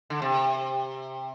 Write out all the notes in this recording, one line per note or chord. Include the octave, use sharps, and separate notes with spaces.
D3
C3